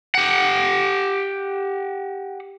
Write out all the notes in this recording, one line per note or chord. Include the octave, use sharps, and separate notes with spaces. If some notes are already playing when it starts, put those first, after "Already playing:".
G4 F#5